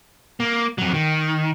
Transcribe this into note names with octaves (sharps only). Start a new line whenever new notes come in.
A#3
F2 F#3
D#3